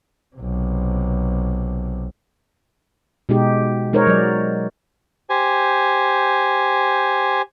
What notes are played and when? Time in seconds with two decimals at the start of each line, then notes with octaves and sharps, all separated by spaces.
0.36 B1 C3
3.29 B2 G#3 D#4 G4
3.93 G#3 D#4 A#4 C5 C#5
4.07 F#3 D5
5.30 G4 C5 G#5